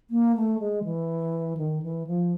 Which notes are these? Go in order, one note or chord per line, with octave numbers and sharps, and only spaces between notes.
A#3
A3
G#3
E3
D#3
E3
F3